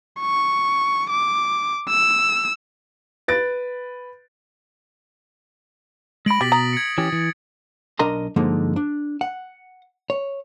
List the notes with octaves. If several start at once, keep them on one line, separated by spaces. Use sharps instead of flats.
C#6
D6
E6
B4 A6 D7
G#3 B5 A#6 D7 F#7
B2 G4 A6 B6 F#7
A#5 D#6
G#6 C#7
E3 C#4 G4
E3
B1 D4 A#4 D#5 A#5 C6
G2 D3 F3 G#3 A#3 D#4
D4
F#5
C#5